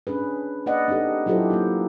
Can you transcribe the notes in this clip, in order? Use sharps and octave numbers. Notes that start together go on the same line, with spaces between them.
C#4 D4 G#4 B4
A#3 B4 D5 D#5 F#5
C4 D4 D#4 G4 A4
F#3 E4 F4 G4 A4 C5
A#3 C4 D#4